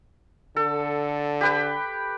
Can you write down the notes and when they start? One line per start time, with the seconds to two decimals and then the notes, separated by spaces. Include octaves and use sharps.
0.56 D3 A4
1.41 G4 B4 G5